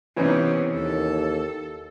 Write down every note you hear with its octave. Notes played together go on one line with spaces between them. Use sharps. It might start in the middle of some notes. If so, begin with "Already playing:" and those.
C3 E3 B3 C#4 D#4
D#2 A4